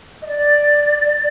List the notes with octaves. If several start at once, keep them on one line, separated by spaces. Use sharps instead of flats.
D#5
D5